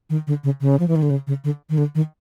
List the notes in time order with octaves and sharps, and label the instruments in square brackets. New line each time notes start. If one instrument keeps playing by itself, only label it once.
[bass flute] D#3
D3
C#3
C#3
F3
E3
D#3
D3
C#3
C#3
D3
D#3
D3
D#3